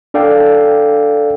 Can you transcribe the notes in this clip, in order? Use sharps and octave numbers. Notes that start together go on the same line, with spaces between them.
D4 A4 D5 F5 G5